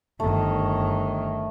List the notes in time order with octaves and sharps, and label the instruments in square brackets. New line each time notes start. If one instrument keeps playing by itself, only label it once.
[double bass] G1 D#3 [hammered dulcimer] A3